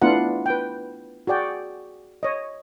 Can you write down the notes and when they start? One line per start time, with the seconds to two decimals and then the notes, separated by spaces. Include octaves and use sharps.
0.02 A3 B3 D4 E4 F4 F#5
0.46 B4 G5
1.27 F#4 G#4 D5 G5
2.23 C#5 D#5